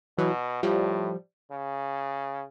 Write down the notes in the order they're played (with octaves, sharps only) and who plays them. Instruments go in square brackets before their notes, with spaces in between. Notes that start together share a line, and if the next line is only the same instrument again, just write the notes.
[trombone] B2 [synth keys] E3 F#3
[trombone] A2 [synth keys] F3 G3
[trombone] C#3